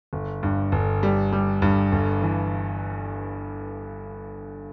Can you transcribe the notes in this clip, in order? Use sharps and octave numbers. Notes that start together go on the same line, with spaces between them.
G1
G2
G1
G3
G3
G2
G1
E3